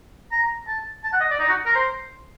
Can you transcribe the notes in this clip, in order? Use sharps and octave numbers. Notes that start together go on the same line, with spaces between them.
A#5
A5
A5
F#5
D#5
D5
D#4
F#4
A#4
C5